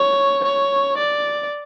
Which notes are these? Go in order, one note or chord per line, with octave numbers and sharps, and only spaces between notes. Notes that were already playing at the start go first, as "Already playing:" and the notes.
Already playing: C#5
C#5
D5